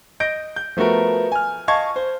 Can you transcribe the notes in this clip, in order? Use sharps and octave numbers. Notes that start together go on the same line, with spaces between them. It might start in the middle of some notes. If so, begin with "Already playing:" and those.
D#5 G6 A#6 D7
G6
F3 A3 B3 F#4 A#4
G#5 F6
D#5 F5 A5 C#6 G#6
C5